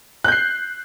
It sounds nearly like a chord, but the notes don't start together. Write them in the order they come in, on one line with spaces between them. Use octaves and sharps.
F#6 G6 C7